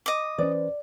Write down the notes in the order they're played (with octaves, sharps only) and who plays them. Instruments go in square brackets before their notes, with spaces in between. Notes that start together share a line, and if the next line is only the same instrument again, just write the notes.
[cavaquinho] D#5 D6
[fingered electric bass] E3 C#4 [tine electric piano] B4 C5 [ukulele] D5